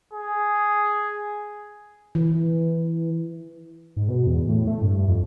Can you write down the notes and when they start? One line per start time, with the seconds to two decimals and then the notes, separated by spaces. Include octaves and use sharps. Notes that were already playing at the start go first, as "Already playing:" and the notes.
0.13 G#4
2.15 E3
3.97 G#2
4.09 B2
4.27 E2
4.49 A2
4.67 A3
4.81 G2
5.08 F2